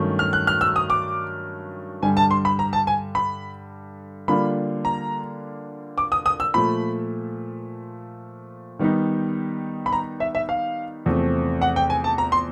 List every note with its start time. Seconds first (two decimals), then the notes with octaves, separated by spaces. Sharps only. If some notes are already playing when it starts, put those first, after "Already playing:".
Already playing: G2 D#3 F#3 A3 C#4
0.19 F6
0.33 F#6
0.47 F6
0.61 E6
0.76 D#6
0.90 D6
2.03 G2 D3 G3 G#5
2.17 A5
2.31 C6
2.45 B5
2.59 A#5
2.73 A5
2.87 G#5
3.15 B5
4.28 D3 G3 A#3 D4 F4 B5
4.85 A#5
5.98 D6
6.12 D#6
6.26 D#6
6.40 E6
6.54 A#2 F3 A3 B5
8.79 D#3 G3 B3 D#4
9.86 B5
9.92 A#5
10.20 E5
10.35 E5
10.49 F5
11.05 E2 C3 F3 A3 C4
11.61 F#5
11.76 G5
11.90 G#5
12.04 A5
12.18 A#5
12.32 C6